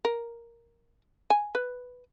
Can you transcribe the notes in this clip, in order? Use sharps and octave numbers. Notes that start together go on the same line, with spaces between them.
A#4
G#5
B4